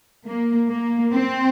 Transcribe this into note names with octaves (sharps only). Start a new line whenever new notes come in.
A#3
A#3
C4